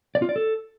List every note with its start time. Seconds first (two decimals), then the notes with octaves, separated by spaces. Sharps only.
0.15 D5
0.22 F4
0.29 D5
0.36 A4